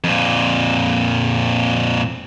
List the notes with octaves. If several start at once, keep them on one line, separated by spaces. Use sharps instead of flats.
F2 A#2